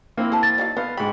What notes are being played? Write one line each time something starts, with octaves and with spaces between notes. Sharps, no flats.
A#3 C4 E4
A4 C5 A5
A6
F#3 D#4 F5
B3 C5 F5
G#2 G4 B5